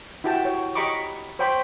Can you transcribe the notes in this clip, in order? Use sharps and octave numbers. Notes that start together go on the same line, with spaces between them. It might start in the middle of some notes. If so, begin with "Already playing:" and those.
E4 F#4 G4 G5 A5
C#5
G4 D#5 A#5 B5 C#6 D6
C5 C#5 G5 B5 D6